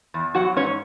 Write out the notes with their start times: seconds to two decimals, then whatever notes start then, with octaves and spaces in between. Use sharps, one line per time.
0.14 E2
0.35 F#3 F#4 F#5
0.56 G#2 C#4 C#5